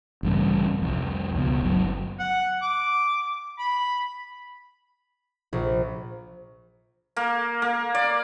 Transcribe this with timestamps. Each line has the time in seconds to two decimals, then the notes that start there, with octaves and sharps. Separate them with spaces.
0.23 A1 G2 C#3
0.82 C2 F2
1.35 C#2 B2
1.62 G1 F#3
2.19 F#5
2.62 D6
3.59 B5
5.53 A#1
7.16 A#3
7.62 A#3
7.95 D5